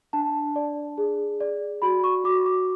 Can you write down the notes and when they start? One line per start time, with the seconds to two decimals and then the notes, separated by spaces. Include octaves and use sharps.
0.13 D4 A5
0.56 D5
0.98 G#4
1.41 D5
1.82 F#4 B5
2.04 C#6
2.24 F#4 D6
2.46 D6